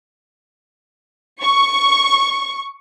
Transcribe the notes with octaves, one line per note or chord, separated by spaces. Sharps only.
C#6